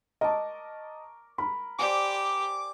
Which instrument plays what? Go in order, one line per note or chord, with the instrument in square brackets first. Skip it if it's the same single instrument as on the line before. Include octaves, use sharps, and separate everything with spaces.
[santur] A#4 C#6 D6 [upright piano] D#5 A5
[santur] A#4 [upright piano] B5
[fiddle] G4 [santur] C5 D5 G#5 [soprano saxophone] D6